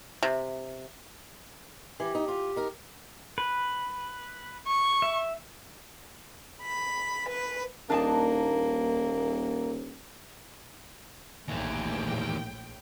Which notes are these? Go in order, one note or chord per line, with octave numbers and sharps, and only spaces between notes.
C3
E3 G4
D#4
F4
D#4 A#4
B4
C#6
E5
B5
B4
D#1 A#3 D4 D#4 A5
A#1 D#2 A2 E3 G5